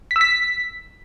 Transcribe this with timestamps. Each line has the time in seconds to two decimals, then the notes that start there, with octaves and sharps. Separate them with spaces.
0.11 B6
0.16 E6
0.21 B6